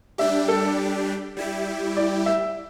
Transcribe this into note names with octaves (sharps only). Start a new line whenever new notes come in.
G3 D4 G4 E5
A4
G3 E4 G4
D5
E5